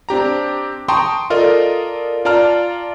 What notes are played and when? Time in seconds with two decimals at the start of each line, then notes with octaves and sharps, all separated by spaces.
0.09 C4 D4 G4 A#5
0.88 G5 A5 A#5 C6 C#6 D#6
1.30 F4 A4 A#4 D5 D#5
2.25 F4 D5 A5 A#5 F6